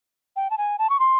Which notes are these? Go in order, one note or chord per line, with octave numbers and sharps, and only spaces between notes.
G5
A5
G#5
A5
C#6
C6